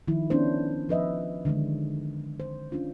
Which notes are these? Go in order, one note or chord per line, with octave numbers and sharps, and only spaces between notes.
D#3 F3 E4
B3 C#4 D4 E4 C5
F3 B4 D#5 E5
D3 D#3 G#3 D4
C5
C#4 D4 F4